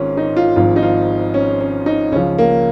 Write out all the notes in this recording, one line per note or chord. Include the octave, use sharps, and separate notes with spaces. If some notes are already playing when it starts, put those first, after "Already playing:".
Already playing: G#1 G#2 D#3 C#4 F4
D#4
F4
G#1 G#2 F3 F4
D#4
F4
C#4
C#4
D#4
C#2 C#3 F3 C#4
A#3